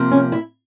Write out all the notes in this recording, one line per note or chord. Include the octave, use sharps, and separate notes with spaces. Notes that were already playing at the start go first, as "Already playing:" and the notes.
Already playing: C3 F3 A#3
C#4
E4